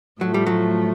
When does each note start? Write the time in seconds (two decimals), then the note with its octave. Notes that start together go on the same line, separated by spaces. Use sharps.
0.21 A2 F3 F#3 A3
0.34 G3
0.47 F#3